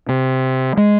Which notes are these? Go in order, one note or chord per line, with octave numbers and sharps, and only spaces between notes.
C3
G#3